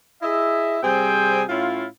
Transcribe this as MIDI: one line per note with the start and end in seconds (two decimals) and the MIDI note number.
0.23 0.78 64
0.23 0.78 68
0.23 0.78 75
0.23 0.78 76
0.83 1.44 48
0.83 1.44 55
0.83 1.44 60
0.83 1.44 68
0.83 1.44 72
0.83 1.44 79
1.48 1.86 45
1.48 1.86 61
1.48 1.86 64
1.48 1.86 65